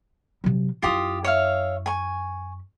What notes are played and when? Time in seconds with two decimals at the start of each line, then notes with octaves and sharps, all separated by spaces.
0.44 C3 F#3
0.82 F#2 E4 F4 G4 D#6
1.24 C#5 E5 F5
1.86 G#5 C#6